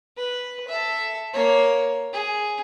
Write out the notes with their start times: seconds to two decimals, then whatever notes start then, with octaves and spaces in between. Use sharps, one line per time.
0.17 B4
0.68 A4 E5
1.33 A#3 C#5
2.13 G#4